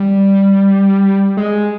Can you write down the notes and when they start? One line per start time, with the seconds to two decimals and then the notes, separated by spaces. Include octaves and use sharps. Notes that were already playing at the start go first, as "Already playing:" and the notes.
Already playing: G3
1.37 G#3